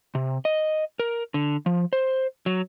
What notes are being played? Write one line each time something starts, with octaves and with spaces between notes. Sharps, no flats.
C3
D#5
A#4
D3
F3
C5
F#3